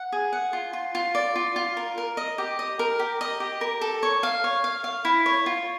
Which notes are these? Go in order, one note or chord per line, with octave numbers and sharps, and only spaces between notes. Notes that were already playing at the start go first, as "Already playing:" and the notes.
Already playing: F#5
G#4
F#5
F4
F4
F4
D5
F4
F4
A#4
A#4
D#5
G4
D#5
A#4
G4
D#5
G4
A#4
A4
C#5
F5
C#5
F5
F5
E4
C#5
F4